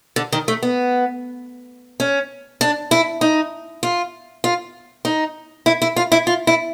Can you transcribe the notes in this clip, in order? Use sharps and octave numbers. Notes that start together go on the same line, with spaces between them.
D3
D#3
A3
B3
C#4
D4
E4
D#4
F4
F4
D#4
E4
E4
F4
E4
F4
E4